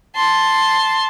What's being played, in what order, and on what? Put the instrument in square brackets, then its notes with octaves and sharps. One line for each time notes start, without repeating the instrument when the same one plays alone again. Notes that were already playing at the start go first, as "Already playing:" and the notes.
[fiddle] A5 C6